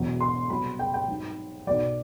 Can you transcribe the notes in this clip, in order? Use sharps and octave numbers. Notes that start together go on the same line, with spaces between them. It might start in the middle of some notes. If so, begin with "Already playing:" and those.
Already playing: E1 E2 B2 F#3
C6
C2 B2 F#3 B5
G5
G5
G#1 G#2 D#3 F#3
B1 B2 F#3 D5